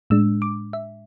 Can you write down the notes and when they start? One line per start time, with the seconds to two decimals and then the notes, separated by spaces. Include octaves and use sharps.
0.10 A2 G#3 D4 E6
0.42 D6
0.73 E5